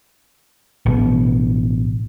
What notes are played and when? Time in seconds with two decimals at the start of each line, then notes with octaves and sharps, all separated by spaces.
0.86 A1 B2